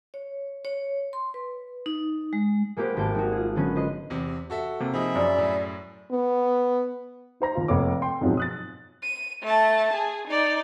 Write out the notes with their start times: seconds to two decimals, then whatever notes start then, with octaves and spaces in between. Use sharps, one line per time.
0.14 C#5
0.65 C#5
1.13 C6
1.34 B4
1.86 D#4
2.33 G#3
2.77 G#3 A#3 B3 G4 B4 C5
2.97 G#1 A#3 G5 A5
3.15 G#3 D#4 F#4
3.32 F4 G#4
3.56 D3 F#3 B3 C#4
3.75 B4 C5 D#5 C6
4.10 E2 C3
4.50 F#4 A4 E5
4.80 C3 A#3
4.93 F3 D#4 G#4 E5 B5
5.15 F#2 D5
5.38 A2
6.11 B3
7.40 D#4 C5 A#5 A#6
7.55 D#2 F4
7.68 F1 A#3 C#5 D6
8.02 G5 C6
8.21 F2 G#2 B2 F3 F#3 G#3
8.37 D#6 F#6 A6
9.03 D#7
9.43 A3 A5
9.93 G#4
10.28 D#4 D5